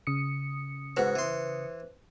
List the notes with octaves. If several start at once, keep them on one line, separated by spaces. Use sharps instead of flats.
C#3 D#6 C#7
G#2 F#4 B4 C5 F#6
E3 C6